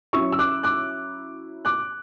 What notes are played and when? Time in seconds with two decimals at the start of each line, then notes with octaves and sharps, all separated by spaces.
0.13 F#3 C#4 E4 C#6 E6
0.32 E6
0.39 D6 F#6
0.63 D6 F#6
1.65 D6 F#6